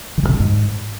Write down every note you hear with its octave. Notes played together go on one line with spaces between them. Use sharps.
D#3
G2
C3
G2
G#2